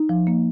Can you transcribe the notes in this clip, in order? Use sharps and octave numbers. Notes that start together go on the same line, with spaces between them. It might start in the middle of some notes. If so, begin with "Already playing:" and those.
Already playing: D#4
F3
A#3